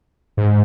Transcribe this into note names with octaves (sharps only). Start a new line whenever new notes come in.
G#2